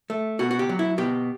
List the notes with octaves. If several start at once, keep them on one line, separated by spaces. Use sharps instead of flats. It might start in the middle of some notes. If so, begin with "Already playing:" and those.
A3
B2 F#4
F#4
G4
F#3
E4
B2 G4